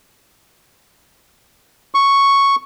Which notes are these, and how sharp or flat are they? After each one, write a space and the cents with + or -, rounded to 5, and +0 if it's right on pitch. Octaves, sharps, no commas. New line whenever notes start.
C#6 +0